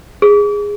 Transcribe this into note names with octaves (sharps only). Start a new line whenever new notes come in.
G#4